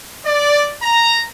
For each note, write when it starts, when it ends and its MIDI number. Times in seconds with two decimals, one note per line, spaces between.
0.24 0.70 74
0.81 1.22 82